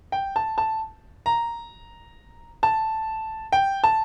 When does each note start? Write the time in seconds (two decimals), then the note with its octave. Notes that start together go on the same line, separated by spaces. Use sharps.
0.12 G5
0.36 A5
0.58 A5
1.26 A#5
2.63 A5
3.52 G5
3.84 A5